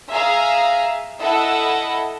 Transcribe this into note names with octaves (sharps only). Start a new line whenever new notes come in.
G#4 E5 F5 A#5
E4 A4 D#5 E5 F#5